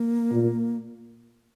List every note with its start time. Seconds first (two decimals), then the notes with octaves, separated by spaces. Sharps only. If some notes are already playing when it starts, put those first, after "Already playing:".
Already playing: A#3
0.32 A#2